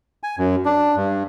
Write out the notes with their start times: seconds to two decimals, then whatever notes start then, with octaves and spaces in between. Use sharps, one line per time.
0.23 G#5
0.39 F#2
0.65 D4
0.96 G2